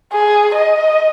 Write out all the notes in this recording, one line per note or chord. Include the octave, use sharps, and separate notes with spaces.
G#4
D#5